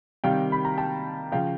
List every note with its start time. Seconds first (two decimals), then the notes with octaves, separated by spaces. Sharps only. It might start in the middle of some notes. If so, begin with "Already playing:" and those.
0.24 C3 D#3 G3 F5 G5
0.52 B5
0.65 A#5
0.78 G5 A5
1.32 C#3 F3 F5 G5